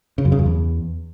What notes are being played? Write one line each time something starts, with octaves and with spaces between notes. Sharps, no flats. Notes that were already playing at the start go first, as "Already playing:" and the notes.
C#3
F#2
C#3
F#2
E2